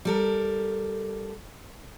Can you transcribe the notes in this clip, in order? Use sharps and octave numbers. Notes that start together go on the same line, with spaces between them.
G3 A4 A#4